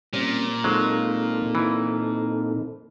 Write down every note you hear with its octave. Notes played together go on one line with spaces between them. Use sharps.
A#2 G3 C4 C#4
F#3 G#3 C4 D#4 A4
E3